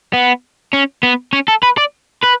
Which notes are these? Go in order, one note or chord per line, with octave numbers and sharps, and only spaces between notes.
B3
C#4
B3
C#4
A4
B4
D5
B4